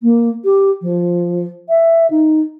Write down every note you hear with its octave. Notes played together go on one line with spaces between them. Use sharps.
A#3
G4
F3
E5
D#4